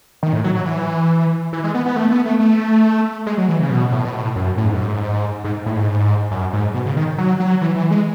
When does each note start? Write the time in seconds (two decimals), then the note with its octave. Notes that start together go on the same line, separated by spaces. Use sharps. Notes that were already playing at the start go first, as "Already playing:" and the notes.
0.23 D#3
0.33 A2
0.44 F#3
0.55 F#3
0.66 E3
1.53 E3
1.64 G#3
1.74 B3
1.86 B3
1.96 A3
2.11 B3
2.25 A3
2.39 A3
3.26 G#3
3.38 F#3
3.48 E3
3.60 C#3
3.70 B2
3.92 A2
4.05 B2
4.14 A2
4.36 F#2
4.57 A2
4.65 G#2
4.74 F#2
4.82 G#2
5.44 G#2
5.66 A2
5.77 G#2
6.31 F#2
6.53 G#2
6.74 B2
6.85 C#3
6.96 D#3
7.18 F#3
7.40 F#3
7.61 E3
7.76 E3
7.91 G#3